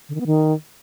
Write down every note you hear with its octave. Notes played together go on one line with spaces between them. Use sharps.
D3
D#3
B3
D#3